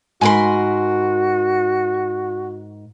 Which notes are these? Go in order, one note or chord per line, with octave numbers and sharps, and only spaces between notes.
G#2 F#4 A#4 G#5 B5 C6